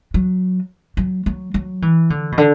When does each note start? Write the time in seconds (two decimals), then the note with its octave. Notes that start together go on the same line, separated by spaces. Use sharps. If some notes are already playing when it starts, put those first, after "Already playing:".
0.14 F#3
0.97 F#3
1.26 F#3
1.54 F#3
1.82 E3
2.10 D3
2.32 B2
2.38 D3